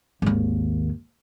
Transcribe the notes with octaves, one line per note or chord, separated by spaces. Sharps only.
G#1 D#2